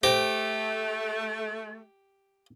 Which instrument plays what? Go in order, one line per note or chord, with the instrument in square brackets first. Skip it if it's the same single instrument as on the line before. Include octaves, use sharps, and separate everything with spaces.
[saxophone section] A3 [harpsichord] G4 [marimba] C5